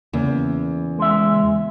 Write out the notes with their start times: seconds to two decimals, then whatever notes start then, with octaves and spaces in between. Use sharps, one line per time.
0.13 E2 C#3 A#3 C#4
0.99 G#3 E5